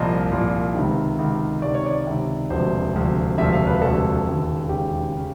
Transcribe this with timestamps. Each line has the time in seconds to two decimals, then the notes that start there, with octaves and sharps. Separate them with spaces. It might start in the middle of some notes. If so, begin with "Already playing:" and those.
Already playing: C2 A#2 F3 D#5
0.32 C2 A#2 F3
0.75 C#2 C3 D#3
1.19 C#2 C3 D#3
1.62 C#2 C3 D#3 D5
1.74 C#5
1.86 D5
2.07 C#2 C3 D#3
2.50 E1 D2 C3 F3 C5
2.94 E1 D2 C3 F3
3.38 E1 D2 C3 F3 E5
3.53 F5
3.67 B4
3.82 E1 D2 C3 F3 A4
4.26 E1 D#2 C#3
4.69 E1 D#2 C#3 G4
5.16 C#3